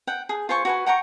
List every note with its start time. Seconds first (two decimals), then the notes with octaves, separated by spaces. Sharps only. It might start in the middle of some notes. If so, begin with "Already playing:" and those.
0.07 F#5 G5
0.29 G#4
0.49 F4 C5 G#5 C#6
0.65 F#4 B4 G#5
0.86 F#5 G5 A#5 C#6